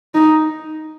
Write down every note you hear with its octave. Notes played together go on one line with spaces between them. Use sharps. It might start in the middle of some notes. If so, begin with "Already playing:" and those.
D#4